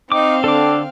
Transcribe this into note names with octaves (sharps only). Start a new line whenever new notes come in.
C4 D#4 F5 D6
D3 D4 A4 D6